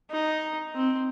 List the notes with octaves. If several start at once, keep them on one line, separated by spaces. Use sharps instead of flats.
D#4
C4